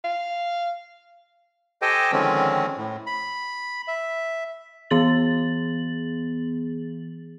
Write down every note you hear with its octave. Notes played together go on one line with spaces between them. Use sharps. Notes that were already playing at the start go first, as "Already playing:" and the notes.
F5
G4 A4 C5 D#5 G5 G#5
D3 D#3 F3 G#3 C4 C#4
A2
B5
E5
E3 B3 G#4 A6 F#7